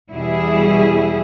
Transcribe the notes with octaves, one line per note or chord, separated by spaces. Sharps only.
E2 B2 E3 G3 E4 G#4